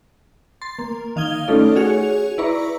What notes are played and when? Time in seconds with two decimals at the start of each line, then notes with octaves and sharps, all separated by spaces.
0.62 C6 A6
0.79 A#3
1.16 D#3 F5 D#6 G#6 G7
1.48 A3 C#4 D#4 F4 A4 D5
1.76 F#4 G#4 C#5 F7
2.38 E4 B4 D5 A#5 C#6